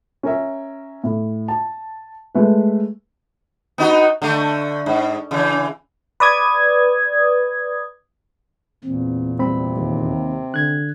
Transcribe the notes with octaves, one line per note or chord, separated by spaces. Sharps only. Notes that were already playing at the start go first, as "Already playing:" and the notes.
C#4 A#4 E5
A2
A5
G#3 A3 B4
B3 D#4 F#4
D3 A3
G#2
C#3 E3
B4 D5 D#6 G#6
E2 A#2 C4
C3 G3 C4 B5
D#2
D3 F#6 G#6